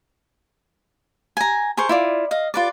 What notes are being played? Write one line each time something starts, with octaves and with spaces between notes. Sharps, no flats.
G#5 A#5
G#4 A#4 C5 C#6
E4 F4 D5
D#5 F5
F4 B4 D5